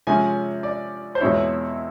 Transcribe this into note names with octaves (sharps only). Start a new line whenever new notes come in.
C3 F3 G#3 C#4 G#5
D5
C5
E2 B2 G#3 C4 E4 C#5